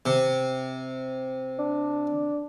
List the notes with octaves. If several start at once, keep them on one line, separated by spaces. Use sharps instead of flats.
C3
D4